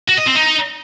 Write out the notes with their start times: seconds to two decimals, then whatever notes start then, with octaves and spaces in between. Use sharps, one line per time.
0.09 F#4
0.18 D#5
0.27 C4
0.36 D#4